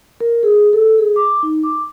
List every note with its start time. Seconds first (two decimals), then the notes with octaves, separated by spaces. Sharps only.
0.21 A#4
0.43 G#4
0.73 A4
0.98 G#4
1.16 D6
1.43 D#4
1.63 D6